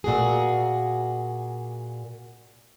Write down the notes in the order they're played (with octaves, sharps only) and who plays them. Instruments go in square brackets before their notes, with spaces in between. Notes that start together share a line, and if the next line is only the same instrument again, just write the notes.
[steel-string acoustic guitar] A#2 F#4 G#4